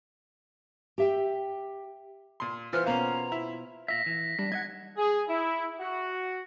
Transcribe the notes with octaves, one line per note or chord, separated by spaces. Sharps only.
G4 E5 G5
A#2 C6
E3 B3 F4 C5 F6
B2 A#3 B3 C#4 F5 A#5
E4
A#2 F4 E5 A#6 B6
E3
G3 D4 B6
D#4 D#5 F#5 G#6
G#4
E4
F#4